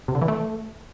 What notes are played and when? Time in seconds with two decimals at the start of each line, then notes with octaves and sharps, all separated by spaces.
0.08 C3
0.15 D3
0.21 E3
0.28 A3